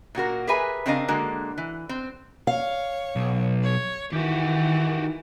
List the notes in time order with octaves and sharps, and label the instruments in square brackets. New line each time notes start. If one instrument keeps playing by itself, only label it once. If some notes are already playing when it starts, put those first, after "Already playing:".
[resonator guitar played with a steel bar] A#2 A#3 F#4 A#4
G4 G#4 A#4 B4 E5 G#5
C#3 C4 D4 A#4 D#5 F5
D3 G#3 A#3 F#4
E3
C4
[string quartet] C#5 [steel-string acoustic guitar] F5
[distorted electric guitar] B1
[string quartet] C#5
[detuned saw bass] D#3 [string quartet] E3 [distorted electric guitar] F#4 G4